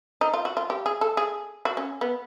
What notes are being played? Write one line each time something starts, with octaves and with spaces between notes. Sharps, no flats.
D#4
F4
F#4
F4
G4
G#4
A4
G#4
F#4
C#4
B3